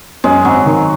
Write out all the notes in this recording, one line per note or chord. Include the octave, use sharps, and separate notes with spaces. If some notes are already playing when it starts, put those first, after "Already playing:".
F#2 G#3
G#1 F#3
D#3